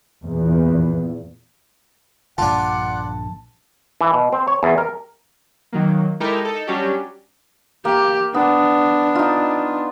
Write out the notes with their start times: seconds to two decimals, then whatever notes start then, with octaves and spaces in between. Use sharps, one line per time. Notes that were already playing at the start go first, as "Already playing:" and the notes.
0.24 E2 A#2
2.38 A#1 G2 D3 D4 F4 F#5 A5
4.01 E3
4.13 B2
4.33 C4
4.48 C#5
4.63 E2
4.78 A#4
5.73 D#3 F#3 A#3
6.20 G#3 D#4 E4 G4 A4 A#4
6.45 D#4 A4
6.67 F#3 G3 C#4 D4 F#4 G4
7.85 A#3 G4
8.34 B3 D4
9.15 D#4 F4